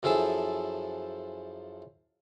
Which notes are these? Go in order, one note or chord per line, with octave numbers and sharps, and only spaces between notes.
F#2 F3 E4 G#4 A4 A5